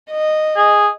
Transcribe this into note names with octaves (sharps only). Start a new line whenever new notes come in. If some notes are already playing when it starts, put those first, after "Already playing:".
D#5
G#4